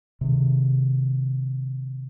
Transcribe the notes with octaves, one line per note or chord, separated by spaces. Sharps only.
C3 D#3